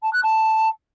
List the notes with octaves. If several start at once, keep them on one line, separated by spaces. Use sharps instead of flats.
A5
F#6
A5